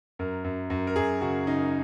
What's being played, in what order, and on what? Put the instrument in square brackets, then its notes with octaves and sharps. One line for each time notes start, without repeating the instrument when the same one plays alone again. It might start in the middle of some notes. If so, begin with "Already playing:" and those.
[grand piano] F#2 A#4
F#2
F#2
A#4
F#2 G#4
C#3 F#4
C#3 D#4